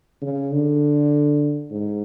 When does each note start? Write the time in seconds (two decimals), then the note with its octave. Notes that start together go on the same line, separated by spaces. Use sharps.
0.21 C#3
0.52 D3
1.71 G#2